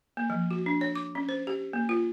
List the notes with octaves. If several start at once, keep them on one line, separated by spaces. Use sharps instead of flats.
A#3
F3
F#4
D4
C#5
D6
C#4
C5
G4
A#3
F4